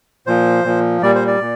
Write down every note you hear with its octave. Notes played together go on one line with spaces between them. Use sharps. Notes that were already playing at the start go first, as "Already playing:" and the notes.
A#2 F3 C5
A#2 F3
A#2 G3 D5
C5
D5
A#2